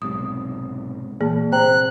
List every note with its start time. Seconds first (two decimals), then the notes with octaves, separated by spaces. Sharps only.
0.02 B1 G#2 C3 D#6
1.21 A#2 E3 A#3 G#4 A5
1.52 C3 C5 G5 A#5 F#6